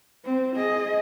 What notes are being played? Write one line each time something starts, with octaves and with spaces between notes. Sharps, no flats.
C4
G#4 D#5